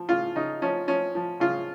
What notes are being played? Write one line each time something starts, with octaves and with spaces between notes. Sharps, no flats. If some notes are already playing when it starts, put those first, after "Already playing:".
Already playing: F3
C#3 F4
C#3 D#4
F3 C#4
F3 C#4
F3
C#3 F4